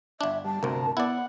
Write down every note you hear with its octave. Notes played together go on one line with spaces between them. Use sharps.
G1 D4 E5
G3 A5
G1 D2 C3 A#4
B3 E4 D5 F#5